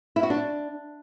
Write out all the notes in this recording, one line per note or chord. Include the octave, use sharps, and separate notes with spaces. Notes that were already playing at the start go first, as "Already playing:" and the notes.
E4
F#4
D4